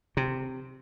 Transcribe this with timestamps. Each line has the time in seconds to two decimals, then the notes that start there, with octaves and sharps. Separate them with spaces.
0.17 C3